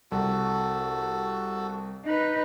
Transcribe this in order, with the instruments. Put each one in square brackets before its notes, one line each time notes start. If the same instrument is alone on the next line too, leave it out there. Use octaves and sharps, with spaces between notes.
[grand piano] C2 [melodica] F#4 A4
[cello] D#4 B4